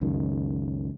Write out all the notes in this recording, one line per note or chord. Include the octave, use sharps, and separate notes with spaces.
C#2 F#2 D#3